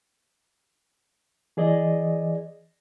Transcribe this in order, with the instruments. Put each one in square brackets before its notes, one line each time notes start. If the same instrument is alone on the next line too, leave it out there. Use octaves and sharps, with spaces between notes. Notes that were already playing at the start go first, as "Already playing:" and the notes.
[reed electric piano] E3 G#4 D5 D#5